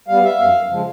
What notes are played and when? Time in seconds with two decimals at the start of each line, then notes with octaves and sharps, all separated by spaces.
0.08 G3 B3 F5
0.24 E5
0.40 F#2 F5
0.70 C#3 F3 G#3